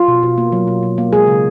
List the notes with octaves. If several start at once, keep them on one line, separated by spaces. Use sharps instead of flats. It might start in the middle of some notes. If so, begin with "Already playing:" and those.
Already playing: F4
B2
B2
A#3
F#3
B2
B2
A#3
G#3 G#4
C#3